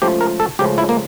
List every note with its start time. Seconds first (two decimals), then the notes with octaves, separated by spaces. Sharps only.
0.02 C#2 C#3 F3 A3 G4
0.21 A#4
0.40 A4
0.59 C#2 C#3 F3 A3 G4
0.78 E4
0.89 A#3